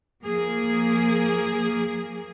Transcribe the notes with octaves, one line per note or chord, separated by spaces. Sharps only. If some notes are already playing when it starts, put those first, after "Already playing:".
F3 A#3 G#4